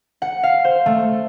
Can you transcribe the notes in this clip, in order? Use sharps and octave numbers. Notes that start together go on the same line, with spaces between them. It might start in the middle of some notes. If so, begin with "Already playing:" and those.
F#5
F5
C5
A3